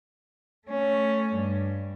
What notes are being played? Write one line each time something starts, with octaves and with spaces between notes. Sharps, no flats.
A3 C#4
G2